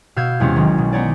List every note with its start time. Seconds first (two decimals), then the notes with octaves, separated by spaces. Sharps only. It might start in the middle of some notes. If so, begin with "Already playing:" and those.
0.16 B2 F5 E6 G6 G#6
0.40 E2 C3 G#3 C#4
0.56 B1 D#3
0.78 B2
0.93 B3 D#4 C#5 D5